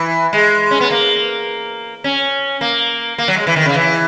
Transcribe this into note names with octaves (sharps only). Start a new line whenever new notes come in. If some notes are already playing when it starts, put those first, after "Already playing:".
Already playing: E3
G#3
C#4
B3
A#3
C#4
A#3
A#3
F#3
G#3
E3
D#3
C#3
E3